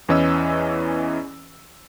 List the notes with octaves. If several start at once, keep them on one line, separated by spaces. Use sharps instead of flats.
E2 E3 C#4 D#5 E6